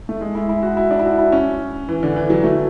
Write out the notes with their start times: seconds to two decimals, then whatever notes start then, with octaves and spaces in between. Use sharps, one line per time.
0.09 A3
0.21 G#3
0.35 E4
0.49 E4
0.63 F#4
0.77 E4
0.91 D4
0.99 E4
1.05 F#4
1.19 E4
1.32 C#4
1.88 E3
2.03 D3
2.16 E3
2.30 F#3
2.44 A3